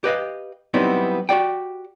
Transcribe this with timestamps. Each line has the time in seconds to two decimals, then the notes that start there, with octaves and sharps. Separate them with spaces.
0.04 G4 B4 D#5 F5
0.74 F#3 G3 B3 C4 D#4 E4
1.29 F#4 G4 D5 G5